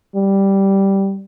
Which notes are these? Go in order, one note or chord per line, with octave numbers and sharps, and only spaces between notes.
G3